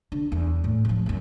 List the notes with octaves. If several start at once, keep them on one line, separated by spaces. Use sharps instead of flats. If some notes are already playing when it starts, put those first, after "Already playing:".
D3
E2
A2
D1 F3
C2 F#2